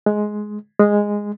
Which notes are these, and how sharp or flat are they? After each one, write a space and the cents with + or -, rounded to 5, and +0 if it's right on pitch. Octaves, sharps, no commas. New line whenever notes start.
G#3 +10
G#3 -10